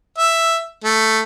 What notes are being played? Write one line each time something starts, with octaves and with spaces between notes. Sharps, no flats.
E5
A3